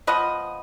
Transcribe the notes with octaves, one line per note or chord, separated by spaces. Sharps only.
F3 B3 B4 D#5